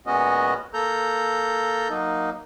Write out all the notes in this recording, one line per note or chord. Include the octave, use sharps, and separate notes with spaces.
A#2 G#3 B3 C#4 F#4 D#5
A#3 A4 A#5 G6
F#3 A#3 D#4